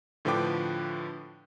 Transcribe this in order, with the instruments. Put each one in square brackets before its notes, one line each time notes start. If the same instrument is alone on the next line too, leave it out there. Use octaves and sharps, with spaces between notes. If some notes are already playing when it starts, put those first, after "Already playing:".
[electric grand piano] A2 D3 F3 B4 G5 D6